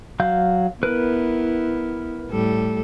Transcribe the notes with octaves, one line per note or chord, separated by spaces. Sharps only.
F#3 F5 G6
B3 E4 A#4 B4 F#6
A2 G3 A4